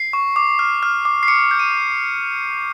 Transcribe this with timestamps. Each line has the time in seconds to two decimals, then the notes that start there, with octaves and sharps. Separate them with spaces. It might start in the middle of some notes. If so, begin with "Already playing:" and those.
Already playing: C7
0.13 C#6
0.36 D6
0.59 F6
0.83 F6
1.05 D6
1.23 C7
1.28 D6 C#7
1.51 G6
1.59 D#7